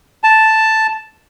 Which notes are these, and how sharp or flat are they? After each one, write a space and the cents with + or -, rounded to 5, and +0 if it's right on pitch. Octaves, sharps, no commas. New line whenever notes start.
A5 +0